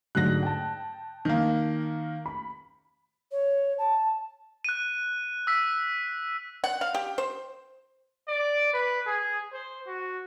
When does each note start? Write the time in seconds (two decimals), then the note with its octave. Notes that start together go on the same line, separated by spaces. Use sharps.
0.15 G#2 D3 F#3 F#6 A#6
0.43 G5 A5
1.25 D#3 A#3
2.26 B5
3.31 C#5
3.78 A5
4.64 F#6 D#7
5.47 E6 B6
6.64 F#5
6.81 F5
6.94 G4
7.18 C5
8.28 D5
8.73 B4
9.07 G#4
9.53 C5
9.87 F#4